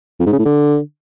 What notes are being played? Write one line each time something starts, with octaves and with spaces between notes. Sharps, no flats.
F2
G#2
C#3
A2
D3